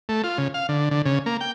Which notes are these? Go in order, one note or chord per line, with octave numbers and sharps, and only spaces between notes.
A3
F4
C#3
F5
D3
D3
C#3
A#3
G5